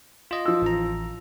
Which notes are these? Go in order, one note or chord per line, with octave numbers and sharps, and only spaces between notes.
F4 D#5
F3 E6
A1 A#5